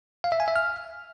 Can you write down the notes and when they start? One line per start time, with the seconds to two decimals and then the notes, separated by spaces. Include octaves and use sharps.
0.24 F5
0.32 E5
0.40 G#5
0.48 E5
0.56 F6